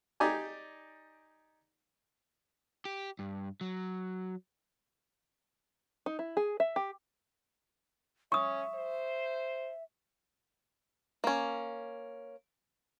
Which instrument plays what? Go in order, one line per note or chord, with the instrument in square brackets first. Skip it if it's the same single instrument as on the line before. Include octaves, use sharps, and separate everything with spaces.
[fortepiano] D#4 G4 D5 G#5
[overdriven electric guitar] G4
G2
F#3
[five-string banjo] D#4
E4
G#4
E5
G4
[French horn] C#4 [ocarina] E5 [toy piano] C#6 D#6
[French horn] C5
[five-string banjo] A#3 C#4